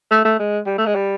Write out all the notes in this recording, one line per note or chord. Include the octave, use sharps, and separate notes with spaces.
A3
A3
G#3
G3
A3
G#3
G3